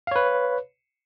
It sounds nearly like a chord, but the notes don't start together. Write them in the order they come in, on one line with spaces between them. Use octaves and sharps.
F5 C#5 B4